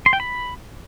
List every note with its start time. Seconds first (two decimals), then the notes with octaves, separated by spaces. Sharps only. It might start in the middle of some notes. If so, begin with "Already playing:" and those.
0.06 C6
0.13 G5
0.20 B5